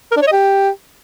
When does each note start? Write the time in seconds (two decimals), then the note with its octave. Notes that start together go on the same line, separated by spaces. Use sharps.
0.11 A#4
0.16 D4
0.22 C#5
0.27 D#5
0.32 G4